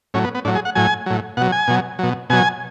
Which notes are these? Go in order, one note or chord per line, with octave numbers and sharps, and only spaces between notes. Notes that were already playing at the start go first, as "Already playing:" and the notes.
A2 F#3 C#4
B3
B3
A2 F#3 D4
G#4
F#5
A2 F#3 G#5
A2 F#3
B2 F#3 F#5
G#5
B2 F#3
B2 F#3
B2 F#3 G#5